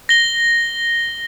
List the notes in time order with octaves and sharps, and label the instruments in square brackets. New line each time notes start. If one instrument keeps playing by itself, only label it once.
[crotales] A#6 G7